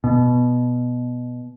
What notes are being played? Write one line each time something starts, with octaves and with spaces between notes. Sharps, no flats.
B2